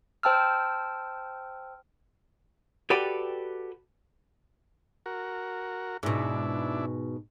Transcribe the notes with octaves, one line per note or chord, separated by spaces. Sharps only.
C5 G5 A5 E6 F6
F#4 G4 A4 B4 D5 G5
F#4 A#4
G#2 B2 D4 E4